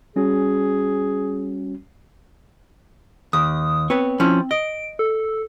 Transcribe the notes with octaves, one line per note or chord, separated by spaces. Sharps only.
G3 C#4 F#4 G#4
D#2 D#6
B3 C4 B4 C#5
F3 C#4 E4
D#5 D7
A4